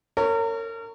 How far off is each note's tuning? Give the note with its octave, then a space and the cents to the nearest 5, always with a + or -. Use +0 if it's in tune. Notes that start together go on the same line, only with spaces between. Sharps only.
A#4 -35 C#5 +0